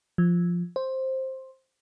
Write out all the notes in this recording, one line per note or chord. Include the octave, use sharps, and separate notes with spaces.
F3
C5